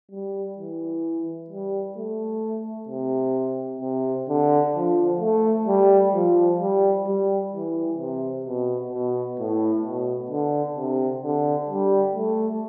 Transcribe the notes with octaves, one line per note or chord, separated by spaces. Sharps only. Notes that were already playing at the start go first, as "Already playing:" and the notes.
G3
E3
G3
A3
C3
C3
D3
F3
A3
G3
F3
G3
G3
E3
C3
B2
B2
A2
B2
D3
C3
D3
G3
A3